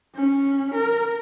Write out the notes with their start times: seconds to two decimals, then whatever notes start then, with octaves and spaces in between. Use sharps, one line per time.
0.15 C#4
0.74 A#4